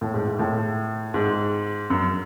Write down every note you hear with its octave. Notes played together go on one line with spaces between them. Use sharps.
A2
G#2
G#2
A2
G#2
F#2